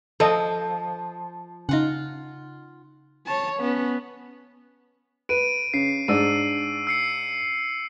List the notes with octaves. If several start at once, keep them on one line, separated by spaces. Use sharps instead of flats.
F3 A4 D#5
C#3 D#4 F4 F#5
C#5 A5
B3 C#4
B4 D7 D#7
C#3 C7
G#2 D4 E6 D#7
E6 C7 C#7